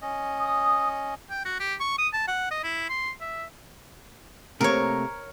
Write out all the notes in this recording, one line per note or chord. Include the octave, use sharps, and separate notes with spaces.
C#4 D#5
D#6
G5
F#4
G4
C#6
D#6
A5
F#5
D#5
E4
C6
E5
C3 A3 A#3 A#4 C#5